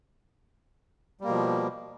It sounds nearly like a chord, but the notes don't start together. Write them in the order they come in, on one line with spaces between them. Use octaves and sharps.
G3 A#3 B2 F3